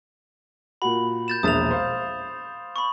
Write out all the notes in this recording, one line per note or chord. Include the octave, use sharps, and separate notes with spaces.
A#2 F#4 B5
G6 A6 E7
E1 A#1 E5 D#6 A6 F7
C5 F5
B5 C#6